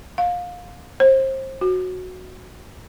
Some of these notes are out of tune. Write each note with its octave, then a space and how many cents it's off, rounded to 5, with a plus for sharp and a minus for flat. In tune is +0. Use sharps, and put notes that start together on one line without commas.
F5 +25
C5 +30
F#4 -5